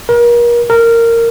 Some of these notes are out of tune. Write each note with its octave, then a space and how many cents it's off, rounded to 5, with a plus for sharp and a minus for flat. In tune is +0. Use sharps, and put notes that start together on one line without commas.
A#4 +35
A#4 -15